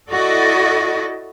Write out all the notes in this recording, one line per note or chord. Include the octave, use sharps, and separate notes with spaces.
E4 F#4 A4 D5 D#5